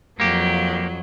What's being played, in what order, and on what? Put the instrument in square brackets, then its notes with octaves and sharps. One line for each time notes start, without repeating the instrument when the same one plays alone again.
[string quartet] F2 F#3 [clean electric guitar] A#3 G4